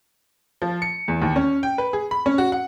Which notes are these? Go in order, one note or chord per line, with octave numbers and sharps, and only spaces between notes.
F3
C#7
E2
D#2
C#4
G5
B4
G#4
B5
C#4
F#4
F#5